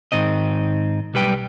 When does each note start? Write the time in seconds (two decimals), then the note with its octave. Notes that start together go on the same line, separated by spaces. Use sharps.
0.12 G#2 D#3 C4 D#5
1.14 B1 G3 B4 G5